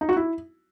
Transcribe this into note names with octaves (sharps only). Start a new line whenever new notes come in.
D#4
F#4
E4